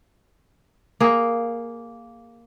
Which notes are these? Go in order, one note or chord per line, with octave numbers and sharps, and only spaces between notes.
A#3 G#4